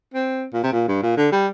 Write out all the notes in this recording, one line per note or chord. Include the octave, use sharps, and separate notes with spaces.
C4
A#2
C3
A#2
G2
A#2
D3
G3